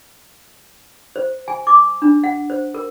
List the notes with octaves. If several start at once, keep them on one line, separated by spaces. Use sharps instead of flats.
C5
G#5
D6
D4
F#5
C5
A#4